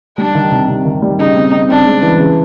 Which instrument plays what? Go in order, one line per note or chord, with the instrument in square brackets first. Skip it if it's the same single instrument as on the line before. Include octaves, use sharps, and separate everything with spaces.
[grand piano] G3 [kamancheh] D4
[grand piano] D#3
C3
C3
D#3
G3
[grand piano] C#3 [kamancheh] D#4
[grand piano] C4
C4
[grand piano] C4 [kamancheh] D4
[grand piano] G#3
E3
C#3